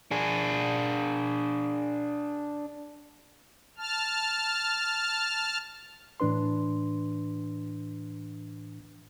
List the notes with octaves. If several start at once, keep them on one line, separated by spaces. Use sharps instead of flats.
D4 G#4
A5 F6
A2 E3 D4 B4 C6